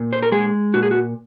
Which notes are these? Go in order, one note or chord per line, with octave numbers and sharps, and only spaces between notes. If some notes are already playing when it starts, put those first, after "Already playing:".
Already playing: A#2
C5
A#4
G#3 G#4
A#2 F#4
G#4
F#4